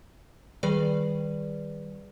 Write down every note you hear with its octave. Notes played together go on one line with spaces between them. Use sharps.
D#3 G3 G#4 B4 D5